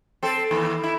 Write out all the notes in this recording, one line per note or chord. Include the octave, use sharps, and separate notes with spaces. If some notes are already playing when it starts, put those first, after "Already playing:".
C4 A4
D#2 E3
E4